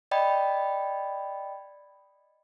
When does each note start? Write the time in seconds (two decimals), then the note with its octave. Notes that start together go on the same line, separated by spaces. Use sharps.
0.11 D5 D#5 G5 B5